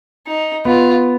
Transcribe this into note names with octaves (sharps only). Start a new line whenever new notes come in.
D#4
B3 F4